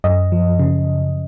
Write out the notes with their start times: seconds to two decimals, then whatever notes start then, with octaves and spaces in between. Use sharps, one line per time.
0.04 F#2 D#5
0.32 F3
0.59 C#3